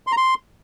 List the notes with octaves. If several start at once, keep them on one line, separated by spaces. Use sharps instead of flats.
C6
A#5
C6